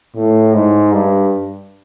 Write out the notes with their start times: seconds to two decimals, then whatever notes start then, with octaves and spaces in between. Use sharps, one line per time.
0.16 A2
0.53 G#2
0.92 G2